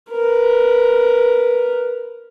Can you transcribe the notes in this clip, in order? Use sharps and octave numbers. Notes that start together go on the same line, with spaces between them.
A#4 B4